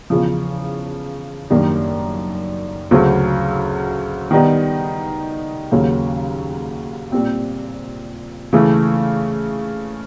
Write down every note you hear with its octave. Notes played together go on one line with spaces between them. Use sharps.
E2 C#3 F3
F#2 D#3 G3 A#3 D4
D2 C#3 F#3
D#3 G3 B3 D#4
D#2 C#3 F#3 A#3 C#4
A#2 G3 C4
C#3 E3 A3